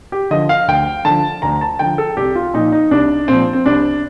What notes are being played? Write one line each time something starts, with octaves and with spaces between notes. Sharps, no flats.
G4
D3 F3 D#5
F5
D2 G5
D3 F3 A5
D2 A#5
A5
D3 F3 G5
A4
C2 G4
F4
A#2 F3 D#4
D#4
C2 D4
A#2 F3 C4
C4
C2 D4